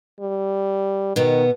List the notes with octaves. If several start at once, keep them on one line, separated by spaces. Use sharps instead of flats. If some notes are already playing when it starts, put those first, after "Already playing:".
G3
B2 D#3 B3